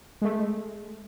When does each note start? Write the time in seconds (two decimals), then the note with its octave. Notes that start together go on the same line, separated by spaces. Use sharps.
0.22 G#3 A3